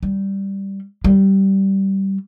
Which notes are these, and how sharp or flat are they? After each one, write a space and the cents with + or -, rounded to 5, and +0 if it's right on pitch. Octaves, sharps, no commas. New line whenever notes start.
G3 +0
G3 -15